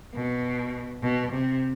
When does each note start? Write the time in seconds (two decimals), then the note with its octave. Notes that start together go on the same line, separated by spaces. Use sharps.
0.14 B2
1.02 B2
1.33 C3